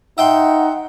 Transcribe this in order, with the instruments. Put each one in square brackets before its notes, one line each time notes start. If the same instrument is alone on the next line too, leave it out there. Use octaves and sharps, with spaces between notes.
[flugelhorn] D#4 [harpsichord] E5 G5 C6 [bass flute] F#5